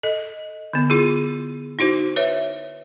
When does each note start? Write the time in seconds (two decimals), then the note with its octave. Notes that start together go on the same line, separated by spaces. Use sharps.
0.03 A4 D#5
0.73 D3 B3
0.90 E4 F4 G#4
1.79 D#4 E4 F#4 C5
2.16 B4 C#5 E5